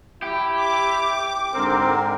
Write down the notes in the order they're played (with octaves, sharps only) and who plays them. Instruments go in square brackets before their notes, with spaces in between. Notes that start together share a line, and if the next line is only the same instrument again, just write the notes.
[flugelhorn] E4 [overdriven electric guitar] G4
[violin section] D6
[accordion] G#2 D3 A#4 [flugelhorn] C4